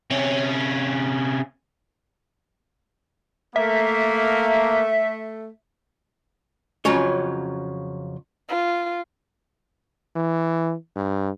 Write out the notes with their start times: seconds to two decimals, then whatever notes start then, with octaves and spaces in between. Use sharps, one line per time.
0.10 C3 C#4
3.56 A3 A#3 E5
6.85 F2 C#3 F#3 C#4 C#5
8.49 F4
10.16 E3
10.96 G2